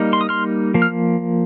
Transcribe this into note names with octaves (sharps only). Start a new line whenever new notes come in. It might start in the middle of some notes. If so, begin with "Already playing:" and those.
Already playing: G3 A#3 D#4
C6
D#6
C6 F6
F3 A#3
F6